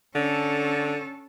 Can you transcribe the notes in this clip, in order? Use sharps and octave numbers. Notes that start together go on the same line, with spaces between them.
D3 C#4 A4